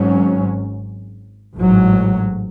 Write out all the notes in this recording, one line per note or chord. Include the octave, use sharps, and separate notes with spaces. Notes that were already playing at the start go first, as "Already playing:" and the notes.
Already playing: G#1 G#2 F#3 C#4
A1 G#2 F#3